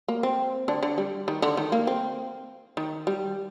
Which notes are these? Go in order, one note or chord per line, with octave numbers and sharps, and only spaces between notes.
A#3
C4
D3 D4
D3 D4
G3
D#3
D3
D#3
A#3
C4
D#3
G3